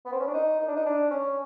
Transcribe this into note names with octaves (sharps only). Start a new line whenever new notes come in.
B3
C4
C#4
D4
D#4
D#4
D4
D#4
D4
C#4